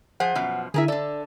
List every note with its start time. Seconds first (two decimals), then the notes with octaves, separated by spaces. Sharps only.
0.20 F3 G#4 C5 F#5
0.35 F#2 B2 F3
0.74 D3 E4 G#4 A#4 E5
0.88 D3 A4 D5